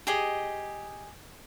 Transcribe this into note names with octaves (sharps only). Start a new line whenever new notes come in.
G4 G#4 D#5